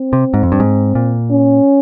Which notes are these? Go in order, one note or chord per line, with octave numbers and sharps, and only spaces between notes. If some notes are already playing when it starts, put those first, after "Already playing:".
Already playing: C4
C3
G#2
F2
G2
G#2
A#2
C#4